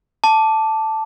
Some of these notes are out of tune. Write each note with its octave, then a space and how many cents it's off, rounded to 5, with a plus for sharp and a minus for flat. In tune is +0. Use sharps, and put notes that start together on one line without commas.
A5 +0 D6 +0